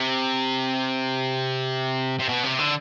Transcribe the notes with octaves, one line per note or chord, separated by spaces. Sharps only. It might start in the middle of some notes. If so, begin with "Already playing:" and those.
Already playing: C3
C3
B2
C3
D3